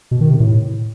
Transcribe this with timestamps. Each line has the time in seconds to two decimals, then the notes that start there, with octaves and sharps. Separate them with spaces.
0.11 B2
0.21 D#3
0.30 C3
0.40 A2